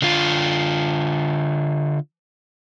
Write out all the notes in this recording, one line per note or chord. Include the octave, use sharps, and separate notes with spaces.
D3 F4